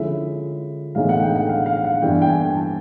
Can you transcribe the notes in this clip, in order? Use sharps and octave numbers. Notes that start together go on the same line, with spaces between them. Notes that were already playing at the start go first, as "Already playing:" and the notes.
Already playing: D3 F3 G#3 C#4 E4 E5
A2 E3 G#3 B3 D#4 F5
F#5
G5
F#5
F5
F5
F#5
G2 E3 G3 B3 D4 G5
G5
G#5
A5